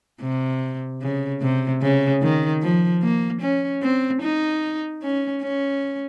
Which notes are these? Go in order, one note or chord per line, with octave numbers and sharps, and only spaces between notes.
C3
C#3
C3
C#3
D#3
F3
A#3
C#4
C4
D#4
C#4
C#4